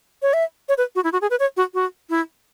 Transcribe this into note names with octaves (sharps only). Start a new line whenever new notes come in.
C#5
E5
C#5
B4
F#4
E4
F#4
G#4
B4
C#5
F#4
F#4
E4